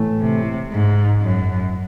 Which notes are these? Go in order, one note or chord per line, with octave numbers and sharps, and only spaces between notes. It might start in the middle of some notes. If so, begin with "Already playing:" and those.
Already playing: A2 E3 A3
C3
G#2
F#2